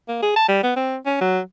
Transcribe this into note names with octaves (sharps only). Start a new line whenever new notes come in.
A#3
G#4
A5
G3
B3
C4
C#4
F#3